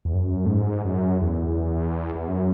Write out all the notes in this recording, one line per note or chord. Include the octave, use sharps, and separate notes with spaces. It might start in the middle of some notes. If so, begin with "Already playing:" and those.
E2
F#2
A2
G#2
F#2
E2
E2
F#2